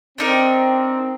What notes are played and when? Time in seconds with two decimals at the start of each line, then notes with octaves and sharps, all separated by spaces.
0.18 C4 D4 D#4 A#4